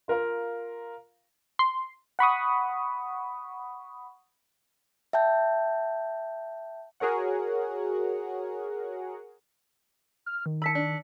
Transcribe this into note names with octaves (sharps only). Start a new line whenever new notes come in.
F4 A#4 F5 A#5
C6
F#5 B5 C#6 D#6
E5 G5 A5 G6
F#4 G#4 A#4 C#5 F#5
F6
D#3
A5 B5 E6 B6 C#7
D4